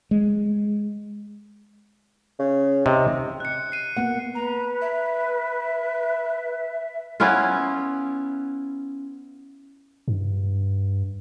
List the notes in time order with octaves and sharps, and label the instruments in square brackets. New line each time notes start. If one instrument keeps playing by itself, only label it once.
[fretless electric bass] G#3
[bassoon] C#3
[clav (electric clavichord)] C3 [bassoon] D#4
[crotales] F#6 C#7
C7 D#7
[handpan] A#3 B3 F#5
[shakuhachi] B4 [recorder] A#5
[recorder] E5
[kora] B3 C#4 E4 F4
[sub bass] G2